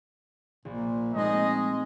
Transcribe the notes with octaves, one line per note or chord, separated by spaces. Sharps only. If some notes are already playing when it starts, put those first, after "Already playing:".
A#1 A#2
G#3 A3 C4 D#4 D#5